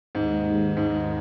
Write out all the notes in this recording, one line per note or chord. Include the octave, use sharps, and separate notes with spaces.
D#2 G#2 D#3 G#3
G#2